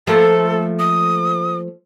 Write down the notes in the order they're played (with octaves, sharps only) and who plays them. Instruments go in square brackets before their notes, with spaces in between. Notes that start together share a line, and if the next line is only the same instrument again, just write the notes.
[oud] F3 A3 A#3 [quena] A4
[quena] D#6